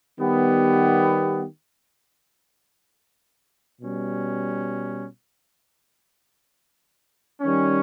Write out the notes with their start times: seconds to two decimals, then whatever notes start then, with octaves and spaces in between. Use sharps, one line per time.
0.17 D#3 G3 B3 G4
3.79 B2 G3 C#4
7.41 D#3 G3 C#4